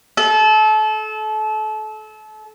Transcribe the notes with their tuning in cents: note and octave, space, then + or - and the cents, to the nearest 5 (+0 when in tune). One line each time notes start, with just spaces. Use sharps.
A4 -30